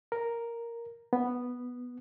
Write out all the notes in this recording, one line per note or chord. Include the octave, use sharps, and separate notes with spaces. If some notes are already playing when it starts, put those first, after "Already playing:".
A#4
B3